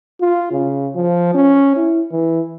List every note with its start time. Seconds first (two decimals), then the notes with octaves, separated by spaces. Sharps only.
0.21 F4
0.51 C#3
0.95 F3
1.34 C#4
1.76 E4
2.12 E3